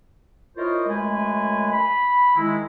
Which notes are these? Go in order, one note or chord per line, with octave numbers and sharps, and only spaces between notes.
E4 F4 A#4 C5 C#5 D#5
F#2 G#3 A3 B4 G#5
B5
D#3 G#3 E4